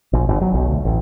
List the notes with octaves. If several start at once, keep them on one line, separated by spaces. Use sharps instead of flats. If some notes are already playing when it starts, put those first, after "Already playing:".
A#1
G1
F#3
B1
D2
A1